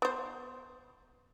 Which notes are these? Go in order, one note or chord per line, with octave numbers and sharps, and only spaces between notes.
B3 C5